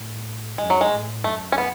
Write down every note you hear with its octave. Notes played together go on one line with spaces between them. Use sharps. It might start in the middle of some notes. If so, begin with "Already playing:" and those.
Already playing: A2
F#2 G#3
F#3
G#3
A2
F#2 A3
C#4
B3